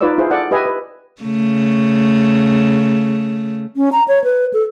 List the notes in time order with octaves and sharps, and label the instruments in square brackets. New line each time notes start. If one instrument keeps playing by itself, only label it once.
[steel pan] D#4 F4 B4 C#5 D5 E6
E4 F4 G#4 C5
A4 D5 F#5
G4 B4 D#5 E5 G#5
B4
[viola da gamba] C#3 A3
[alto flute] C#4
A#5
C#5
B4
A4